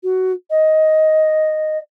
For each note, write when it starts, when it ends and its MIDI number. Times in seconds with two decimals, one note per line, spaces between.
0.03 0.32 66
0.50 1.78 75